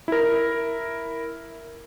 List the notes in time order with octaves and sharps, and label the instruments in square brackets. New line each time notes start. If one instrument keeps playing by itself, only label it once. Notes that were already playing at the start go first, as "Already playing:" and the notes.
[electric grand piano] E4 A#4